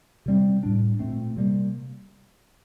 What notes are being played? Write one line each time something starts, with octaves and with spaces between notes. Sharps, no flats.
C3 G3 C4
A2 G3 D4
A#2 A3 C4
C3 G3 A#3